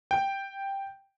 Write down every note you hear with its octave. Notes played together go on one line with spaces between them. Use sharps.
G5